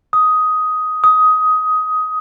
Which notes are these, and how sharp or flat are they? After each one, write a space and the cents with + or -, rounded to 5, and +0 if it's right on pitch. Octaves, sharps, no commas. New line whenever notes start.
D#6 +10
D#6 +15